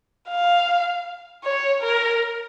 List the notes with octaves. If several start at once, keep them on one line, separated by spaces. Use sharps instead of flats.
F5
C#5
A#4